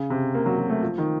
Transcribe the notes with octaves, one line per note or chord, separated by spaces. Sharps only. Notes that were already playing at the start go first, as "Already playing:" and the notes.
Already playing: C#3
C3
A#3
F#3
F#3
A3
F3
D#3